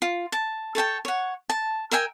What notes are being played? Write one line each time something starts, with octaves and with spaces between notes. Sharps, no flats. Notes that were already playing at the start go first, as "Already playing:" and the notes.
F4
A5
A4 C#5 G5 A5
C#5 F#5
A5
A#4 E5 G5 G#5